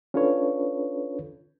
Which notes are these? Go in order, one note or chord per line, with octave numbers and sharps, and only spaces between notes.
C#4 D4 F4 A4 B4 C#5